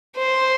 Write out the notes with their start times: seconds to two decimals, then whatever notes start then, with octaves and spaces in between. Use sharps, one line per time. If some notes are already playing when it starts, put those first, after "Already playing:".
0.18 C5